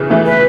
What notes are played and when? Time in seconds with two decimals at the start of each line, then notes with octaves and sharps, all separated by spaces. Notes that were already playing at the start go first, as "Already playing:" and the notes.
Already playing: C#3 E3
0.10 E3 A3
0.26 B4